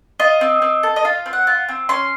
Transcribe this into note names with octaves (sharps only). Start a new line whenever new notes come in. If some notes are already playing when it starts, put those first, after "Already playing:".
F4 D#5
C4
C4
A4
D#5
F4 F5
C4
F#5
F4
C4
C#4 C6